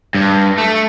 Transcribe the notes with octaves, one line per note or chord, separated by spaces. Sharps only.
G2
A3